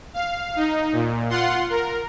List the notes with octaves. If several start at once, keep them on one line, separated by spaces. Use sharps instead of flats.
F5
D#4
A#2
F4 F#5 C6
A#4